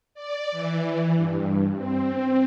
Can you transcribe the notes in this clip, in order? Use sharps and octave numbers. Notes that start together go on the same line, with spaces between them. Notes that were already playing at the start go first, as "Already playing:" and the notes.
D5
E3
G2
C4